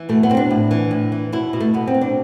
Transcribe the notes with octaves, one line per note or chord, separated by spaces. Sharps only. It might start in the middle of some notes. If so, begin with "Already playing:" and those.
Already playing: E3
B2 A3
B3
B2 C4
D4
A2
E3
A2
E3
B2 E4
B2
A3
B2 B3
C4
B2
D4